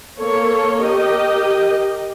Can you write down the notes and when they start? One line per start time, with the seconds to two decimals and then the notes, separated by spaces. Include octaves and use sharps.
0.20 A#3 A4 C#5
0.83 G4 A#4 D#5